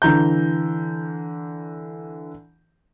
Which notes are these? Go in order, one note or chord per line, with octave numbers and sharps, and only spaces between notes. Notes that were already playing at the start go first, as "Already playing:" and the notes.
D3 E3 A#5 G6